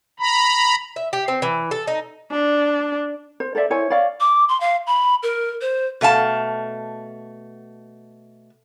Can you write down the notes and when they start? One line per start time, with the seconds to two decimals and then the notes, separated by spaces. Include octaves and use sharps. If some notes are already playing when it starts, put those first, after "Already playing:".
0.20 A#5 B5
0.96 E5
1.13 G4
1.28 C4
1.42 E3
1.71 A4
1.87 D#4
2.31 D4
3.40 C5
3.55 A4 C5 D5 E5
3.70 E4 C5 C#5 G#5
3.90 C#5 D5 F5
4.20 D6
4.49 C6
4.60 F5
4.87 B5
5.23 A#4
5.61 C5
6.01 B2 A3 F5 A5